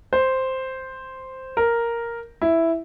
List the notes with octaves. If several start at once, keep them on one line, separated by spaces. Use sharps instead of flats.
C5
A#4
E4